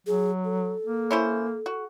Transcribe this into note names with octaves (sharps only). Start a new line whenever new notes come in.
F#3 G#4
A4
A#3
C#4 E4 C5
F#4